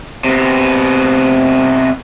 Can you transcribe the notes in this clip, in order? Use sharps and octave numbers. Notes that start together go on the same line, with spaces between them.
C3 B3